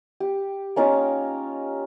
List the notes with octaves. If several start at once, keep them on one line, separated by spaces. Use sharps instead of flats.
G4
A#3 C#4 D#4 F4